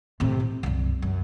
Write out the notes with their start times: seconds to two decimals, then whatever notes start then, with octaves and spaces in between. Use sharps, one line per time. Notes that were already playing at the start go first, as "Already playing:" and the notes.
0.20 A2 C3
0.40 A2
0.63 C2 F#2
1.02 F#2